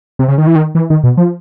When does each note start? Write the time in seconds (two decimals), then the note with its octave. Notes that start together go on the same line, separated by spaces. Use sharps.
0.19 C3
0.28 C#3
0.38 D#3
0.47 E3
0.56 D#3
0.75 E3
0.90 D#3
1.04 B2
1.17 F3